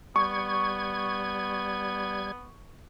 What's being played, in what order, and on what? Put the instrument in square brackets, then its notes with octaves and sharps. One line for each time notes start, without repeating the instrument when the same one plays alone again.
[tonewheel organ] G3 G#6 [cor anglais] B3 [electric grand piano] C#6